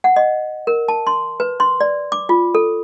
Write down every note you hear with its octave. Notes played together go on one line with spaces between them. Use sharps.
F#5
D#5
A#4
A5
C6
B4
C6
D5
D6
F4
A4